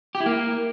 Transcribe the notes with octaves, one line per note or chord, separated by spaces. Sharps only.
G4
E4
A#3